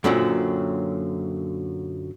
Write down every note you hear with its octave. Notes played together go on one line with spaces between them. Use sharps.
F#2 A#2 D3 F#3 C4